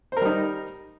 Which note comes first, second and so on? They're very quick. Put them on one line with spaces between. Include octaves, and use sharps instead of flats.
C5 A#4 G3 D#4